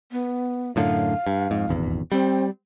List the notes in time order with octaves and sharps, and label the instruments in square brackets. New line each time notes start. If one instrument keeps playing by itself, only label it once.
[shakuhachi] B3
[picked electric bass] F#2 A2 D3 [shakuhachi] F5
[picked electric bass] G2
F2 G#2
D#1 G#1 E2
[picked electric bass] G3 [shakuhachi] C4